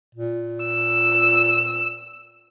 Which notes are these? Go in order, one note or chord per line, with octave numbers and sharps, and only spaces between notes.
A#2
E6